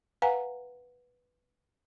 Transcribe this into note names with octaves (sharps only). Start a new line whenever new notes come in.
B4 F5 F#5 G#5 A#5